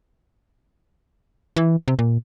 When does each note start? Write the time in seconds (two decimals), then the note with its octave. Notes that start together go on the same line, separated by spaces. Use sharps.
1.56 E3
1.88 C3
1.99 A#2